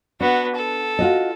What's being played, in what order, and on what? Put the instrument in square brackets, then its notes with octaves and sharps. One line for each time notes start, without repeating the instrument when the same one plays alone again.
[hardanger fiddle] B3 F#4 [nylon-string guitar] D4
[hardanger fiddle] A4
[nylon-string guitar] F4 F#4 D#5